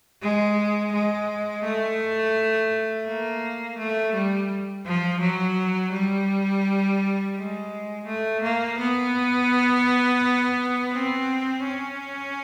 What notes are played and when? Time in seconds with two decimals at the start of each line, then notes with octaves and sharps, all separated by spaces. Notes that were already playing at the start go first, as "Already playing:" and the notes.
0.22 G#3
0.92 G#3
1.64 A3
3.07 A#3
3.78 A3
4.14 G3
4.86 F3
5.21 F#3
5.93 G3
7.36 G#3
8.07 A3
8.42 A#3
8.78 B3
10.93 C4
11.64 C#4